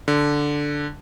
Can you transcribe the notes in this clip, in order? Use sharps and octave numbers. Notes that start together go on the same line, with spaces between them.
D3